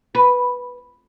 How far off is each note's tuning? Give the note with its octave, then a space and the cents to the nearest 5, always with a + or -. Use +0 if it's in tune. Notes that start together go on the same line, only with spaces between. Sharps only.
B4 -5